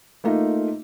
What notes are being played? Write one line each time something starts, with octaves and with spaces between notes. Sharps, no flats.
A3 A#3 D#4 F4 E5